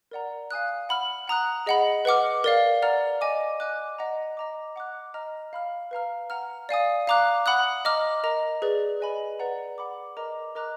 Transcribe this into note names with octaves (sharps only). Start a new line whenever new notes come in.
A#4 D5 F#5 A#5
F5 G#5 D#6 F#6
F#5 B5 F6
F#5 A#5 D#6 F#6
G#4 D#5 F#5 B5
B4 D#5 F#5 D6 F6
A#4 D5 F5
A#4 D5 F#5 A#5 F6
D#5 G#5 D6
D#5 G#5 D6 F#6
D#5 F#5 A#5
D#5 A#5 D6
F#5 D6 F#6
D#5 A#5 F6
F5 B5 F6
B4 F5 A#5 F6
F#5 A#5 F6
D5 F5 G#5 D#6
F5 A#5 D6 F#6
F#5 B5 D#6 F#6
D#5 A#5 D6 F6
A#4 D#5 A#5
G#4 B4 D5
B4 D#5 G#5 B5
B4 D5 F#5 A#5
F#5 B5 D6
A#4 D#5 A#5 D6
A#4 D#5 A#5 D6 F#6